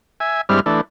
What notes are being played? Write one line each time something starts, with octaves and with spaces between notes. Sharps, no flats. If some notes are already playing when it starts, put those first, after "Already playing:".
E5 G#5
G2 G3 G#3 C4 E4 F6
E3 A3 D4